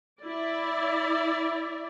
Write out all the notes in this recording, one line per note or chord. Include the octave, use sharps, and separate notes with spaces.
E4 D5